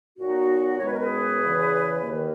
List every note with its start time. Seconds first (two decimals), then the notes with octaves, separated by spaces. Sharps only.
0.18 A#2 F#3 B3 D#4 F#4
0.79 F#2 D#3 G#3 B3 C#5
0.87 B4
0.94 A#4
1.01 G#4 B4
1.41 E2 C#3 E3
2.02 D#2 D#3 A#3